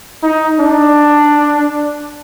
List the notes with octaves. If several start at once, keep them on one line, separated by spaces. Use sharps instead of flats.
D#4
D4